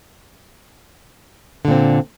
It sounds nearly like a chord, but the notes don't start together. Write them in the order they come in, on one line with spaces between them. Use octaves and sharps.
D3 A#2 C4